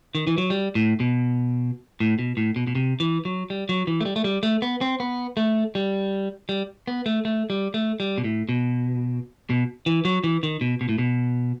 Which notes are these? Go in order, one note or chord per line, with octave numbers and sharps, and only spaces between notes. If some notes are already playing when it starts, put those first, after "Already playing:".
D#3
E3
F#3
G3
A2
B2
A2
B2
A2
B2
B2
C3
E3
F#3
G3
F#3
E3
A3
G3
A3
G3
A3
B3
C4
B3
A3
G3
G3
B3
A3
A3
G3
A3
G3
B2
A2
B2
B2
E3
F#3
E3
D#3
B2
B2
A2
B2